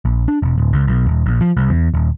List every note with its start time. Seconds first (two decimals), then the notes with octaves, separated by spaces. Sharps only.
0.05 A#1
0.28 D4
0.42 E1
0.58 D1
0.73 C#2
0.87 B1
1.06 D#1
1.26 A#1
1.41 F3
1.57 C2
1.70 E2
1.94 D#1